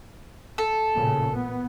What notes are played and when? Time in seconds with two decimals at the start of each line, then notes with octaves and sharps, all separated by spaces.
0.58 A4
0.94 A1 A#2 C#3
1.34 B3